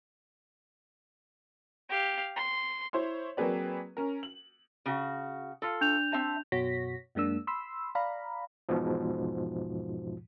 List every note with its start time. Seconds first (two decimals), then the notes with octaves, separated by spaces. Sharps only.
1.89 G4 F5
2.36 C6
2.93 E4 C5 C#5 C6
3.37 F#3 A#3 C4 G#4 B4 D5
3.97 C#4 A#4
4.23 F#7
4.86 C#3 F#4
5.62 F4 A4
5.81 D4 G6 F7
6.12 C4 E5 A5
6.52 F#2 B2 F#4 C#5 A#6 B6
7.15 F#2 G#3 A#3 D4 E6
7.47 B5 C6 E6
7.95 D5 F5 A#5 B5
8.69 E2 G#2 B2 F3